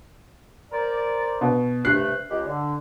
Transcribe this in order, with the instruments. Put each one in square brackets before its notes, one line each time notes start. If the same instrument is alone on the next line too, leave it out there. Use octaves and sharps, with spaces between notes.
[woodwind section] A#4 C5 D5
[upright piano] B2
[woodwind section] G2 C3 A3 [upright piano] F#6 C7
[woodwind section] C#2 G#3 G4
D3